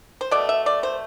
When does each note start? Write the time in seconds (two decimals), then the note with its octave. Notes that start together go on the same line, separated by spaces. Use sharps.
0.21 C5
0.31 B2 A3 D5
0.49 E5
0.66 D5
0.83 C5